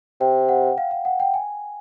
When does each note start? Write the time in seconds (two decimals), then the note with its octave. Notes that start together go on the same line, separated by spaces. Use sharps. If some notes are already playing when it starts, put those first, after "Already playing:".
0.20 C3 G5
0.49 F#5
0.78 F5
0.91 F5
1.05 F#5
1.20 G5
1.34 G#5